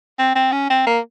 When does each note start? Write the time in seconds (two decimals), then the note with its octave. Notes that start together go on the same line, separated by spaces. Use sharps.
0.19 C4
0.35 C4
0.52 C#4
0.70 C4
0.87 A#3